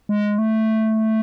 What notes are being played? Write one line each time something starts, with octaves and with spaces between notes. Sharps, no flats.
G#3
A3